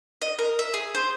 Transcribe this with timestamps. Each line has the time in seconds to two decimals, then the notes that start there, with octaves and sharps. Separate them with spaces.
0.22 D#5
0.39 A#4
0.59 E5
0.74 G#4
0.95 C5